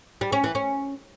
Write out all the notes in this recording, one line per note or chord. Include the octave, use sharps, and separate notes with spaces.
G3
C#4
E3
C#4